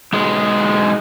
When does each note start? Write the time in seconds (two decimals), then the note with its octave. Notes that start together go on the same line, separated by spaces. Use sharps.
0.13 B1 G#3